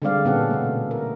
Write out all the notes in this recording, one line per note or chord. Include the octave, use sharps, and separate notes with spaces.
D3 G3 G#3 C4 D5 F5
A#2 B3 C#4 G4 A4 F#5
B2 A3
A#4